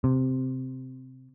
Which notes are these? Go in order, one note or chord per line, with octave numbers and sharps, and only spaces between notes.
C3